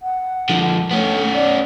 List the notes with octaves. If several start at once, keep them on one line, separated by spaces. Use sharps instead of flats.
F#5
D3 F3
A3 B3 C#4
D5